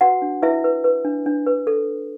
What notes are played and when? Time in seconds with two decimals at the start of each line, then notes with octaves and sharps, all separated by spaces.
0.01 F#4 B4 F#5
0.22 D4
0.42 E4 B4 E5
0.64 B4
0.84 B4
1.05 D4
1.26 D4
1.47 B4
1.67 A4